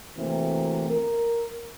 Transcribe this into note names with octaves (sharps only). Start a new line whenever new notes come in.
C3 E3 A3 A#3 C4 F#4
A#4